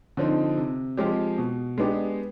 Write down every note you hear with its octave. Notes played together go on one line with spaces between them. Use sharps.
D3 F3 C4 D#4
C3
F3 G#3 C4 G4
B2
G#3 B3 D4 G4